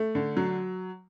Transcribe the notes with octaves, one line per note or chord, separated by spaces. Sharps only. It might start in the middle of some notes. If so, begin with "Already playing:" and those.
Already playing: A3
D3
F#3